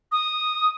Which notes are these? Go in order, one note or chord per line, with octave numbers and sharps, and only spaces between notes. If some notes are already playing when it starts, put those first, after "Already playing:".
D#6